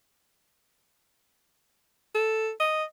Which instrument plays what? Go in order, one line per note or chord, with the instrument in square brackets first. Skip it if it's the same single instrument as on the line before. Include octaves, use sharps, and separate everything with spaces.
[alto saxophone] A4
D#5